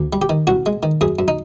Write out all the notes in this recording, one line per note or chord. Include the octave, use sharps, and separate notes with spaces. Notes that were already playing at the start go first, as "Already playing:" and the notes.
Already playing: D2
G3
G4
D#3
C2 F#4
G#3
D#3
F#2 G#4
F#2
D#4